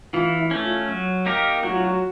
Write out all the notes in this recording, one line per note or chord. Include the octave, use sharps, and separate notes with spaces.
E3 F4
E4
A3 C#4
F4
F#3
A#3 D#4 G4 A#4
F#3 F#4
F4
F#4